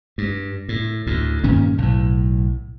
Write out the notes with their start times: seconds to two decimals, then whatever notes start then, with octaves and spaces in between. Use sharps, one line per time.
0.18 G2
0.69 A2
1.07 D2 A2
1.44 G2 A#2 D#3 C#4
1.78 B1 A2